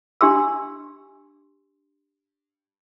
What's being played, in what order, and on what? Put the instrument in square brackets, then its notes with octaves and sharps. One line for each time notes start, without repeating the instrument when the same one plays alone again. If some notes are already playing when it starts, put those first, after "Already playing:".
[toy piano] D4 G4 C6 E6